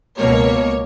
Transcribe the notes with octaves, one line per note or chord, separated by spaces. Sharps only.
C#2 B2 A#3 C#5